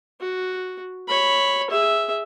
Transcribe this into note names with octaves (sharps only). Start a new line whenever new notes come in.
F#4
C#5 B5
G#4 E5